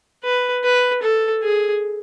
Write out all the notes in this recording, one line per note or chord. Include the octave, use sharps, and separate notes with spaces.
B4
B4
A4
G#4